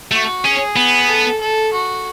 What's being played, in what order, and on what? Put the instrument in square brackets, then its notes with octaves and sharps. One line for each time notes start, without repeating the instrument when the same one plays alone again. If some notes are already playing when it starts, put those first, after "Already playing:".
[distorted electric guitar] A3 [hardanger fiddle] F#4
[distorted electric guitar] C#4 [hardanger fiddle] G#4
[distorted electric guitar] B3
[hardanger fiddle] A4
A4
F#4